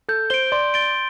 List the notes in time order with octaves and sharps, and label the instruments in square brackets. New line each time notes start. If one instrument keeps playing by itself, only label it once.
[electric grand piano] A4 [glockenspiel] G6
[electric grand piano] C5 [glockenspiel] D7 G7
[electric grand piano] D5 [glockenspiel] C6
[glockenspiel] A6 D7 G7